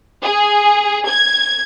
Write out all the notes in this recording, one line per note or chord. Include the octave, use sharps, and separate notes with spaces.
G#4
G#6